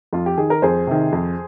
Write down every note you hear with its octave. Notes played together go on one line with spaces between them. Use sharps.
F2 F4
G4
D#3 G#4
A#4
F2 G#4 C5
C3 D#3
F2